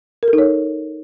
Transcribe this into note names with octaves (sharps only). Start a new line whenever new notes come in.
A#4
A4
D#4
C#5